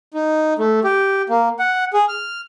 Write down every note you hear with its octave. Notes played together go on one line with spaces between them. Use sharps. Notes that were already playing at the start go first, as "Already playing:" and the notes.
D#4
A3
G4
A#3
F#5
G#4
F6